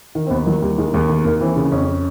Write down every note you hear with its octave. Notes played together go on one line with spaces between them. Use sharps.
D#3
C4
D#2 B3
D#3 F#3
D#2 G3
D#3 G#3
D#2 G#3
D#3 A3
D#2 A#3
E3 C4
C#3
F2 C#4